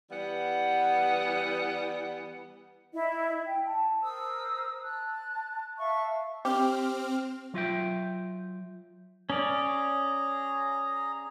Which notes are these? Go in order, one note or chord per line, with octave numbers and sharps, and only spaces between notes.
E3 G3 B3 F#5
E4 D#5
G5
A5
A#4 C5 D#6 E6
A5 F#6
E5 F5 A5 C#6
C4 G4 F6
F#3 F4 E5 G5
C#4 G#4 D5 A#5